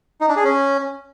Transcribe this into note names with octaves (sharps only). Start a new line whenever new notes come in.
D#4
D4
G#4
C#4